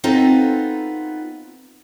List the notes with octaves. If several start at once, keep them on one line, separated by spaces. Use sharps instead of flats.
B3 C4 D#4 F4 A4